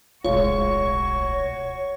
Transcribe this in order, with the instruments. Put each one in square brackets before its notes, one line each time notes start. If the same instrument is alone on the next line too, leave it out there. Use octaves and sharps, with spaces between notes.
[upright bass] D1 B1 [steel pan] G#3 F4 [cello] F#4 [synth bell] C#5